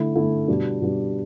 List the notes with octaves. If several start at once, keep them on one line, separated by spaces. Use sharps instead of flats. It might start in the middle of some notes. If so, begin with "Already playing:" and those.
Already playing: D3 A3 E4
D3 A3 E4
B2 G3 D4
B2 G3 D4